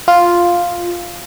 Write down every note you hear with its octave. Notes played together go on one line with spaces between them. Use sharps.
F4